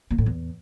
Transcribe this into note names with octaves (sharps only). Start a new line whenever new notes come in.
A#2
A2
E2